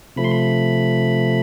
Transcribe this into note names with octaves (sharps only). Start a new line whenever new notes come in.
C3 F3 A3 B5
C6
B5